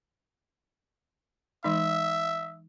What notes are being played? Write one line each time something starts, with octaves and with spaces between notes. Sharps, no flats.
E3 G#3 D#4 E5